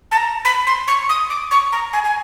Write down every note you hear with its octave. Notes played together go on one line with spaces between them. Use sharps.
A5
A#5
B5
C6
C#6
D#6
D6
C#6
A#5
G#5
G#5